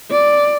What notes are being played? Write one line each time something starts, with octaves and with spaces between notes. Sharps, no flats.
D5